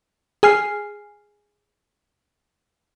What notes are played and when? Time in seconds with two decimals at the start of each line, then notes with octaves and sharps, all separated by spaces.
0.43 G#4 G#5 F6 C7